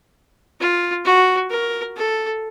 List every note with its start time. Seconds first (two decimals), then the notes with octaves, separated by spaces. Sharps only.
0.61 F4
1.05 F#4
1.50 A#4
1.96 A4